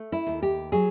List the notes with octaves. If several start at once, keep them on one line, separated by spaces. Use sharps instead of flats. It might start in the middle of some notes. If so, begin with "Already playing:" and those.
Already playing: A3
E4
D#2
G4
F#3 G#4